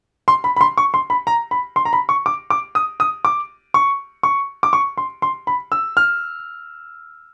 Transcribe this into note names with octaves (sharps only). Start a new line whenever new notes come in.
C6
B5
B5
C6
C#6
C6
B5
A#5
B5
C6
A#5
B5
C#6
D6
D6
D#6
D#6
D6
C#6
C#6
D6
C#6
C6
C6
B5
E6
F6